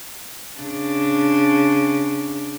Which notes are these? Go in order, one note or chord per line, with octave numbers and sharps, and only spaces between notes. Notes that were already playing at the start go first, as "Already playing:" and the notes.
C#3 D4